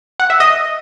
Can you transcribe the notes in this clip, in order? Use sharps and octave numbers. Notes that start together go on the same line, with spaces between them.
F#5
E5
D#5